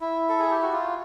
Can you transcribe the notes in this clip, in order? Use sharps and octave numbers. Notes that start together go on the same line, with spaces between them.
E4
A4
G#4
G4
F#4
F4